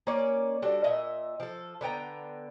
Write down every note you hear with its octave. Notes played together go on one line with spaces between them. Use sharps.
A#3 C#4 C#5 D5
G3 D4 F#4 A4
A#2 D#5 E5
F3 A4
D3 B3 G5 A#5